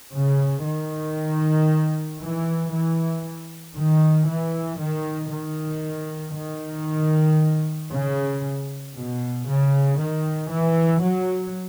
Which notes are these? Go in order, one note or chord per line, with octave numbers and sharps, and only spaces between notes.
C#3
D#3
E3
E3
D#3
E3
D#3
D#3
D#3
C#3
B2
C#3
D#3
E3
F#3